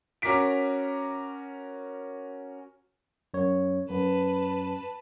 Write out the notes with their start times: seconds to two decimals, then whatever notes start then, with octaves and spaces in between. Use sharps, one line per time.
0.22 C#4 F#4 A#4 D6 B6 D7
3.34 F#2 C#5
3.90 F#2 B4 A5